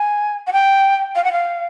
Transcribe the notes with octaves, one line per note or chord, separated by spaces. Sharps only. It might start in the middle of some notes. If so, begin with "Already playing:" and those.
Already playing: G#5
F#5
G5
F5
F#5
F5